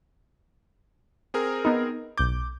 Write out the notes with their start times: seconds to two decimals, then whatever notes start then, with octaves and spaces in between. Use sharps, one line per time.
1.34 C4 G#4 A#4
1.65 B3 D#4
2.17 B1 D6 G6